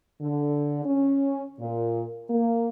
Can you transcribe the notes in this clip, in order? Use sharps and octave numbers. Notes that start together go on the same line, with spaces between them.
D3
C#4
A#2
A#3